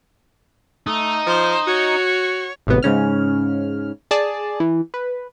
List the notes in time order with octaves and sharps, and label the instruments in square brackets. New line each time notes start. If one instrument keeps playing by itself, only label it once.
[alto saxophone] A3 [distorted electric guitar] D#4
[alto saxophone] F3 [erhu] C5
[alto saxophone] F#4 [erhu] C#5
[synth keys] G#1 A2 C3 B3
G#2 C#3 C#4 F6
G#4 D5 A5
E3
B4